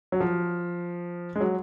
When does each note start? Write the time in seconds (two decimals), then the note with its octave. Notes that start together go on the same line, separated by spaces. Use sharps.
0.12 F#3
0.20 F3
1.35 G#3
1.40 F#3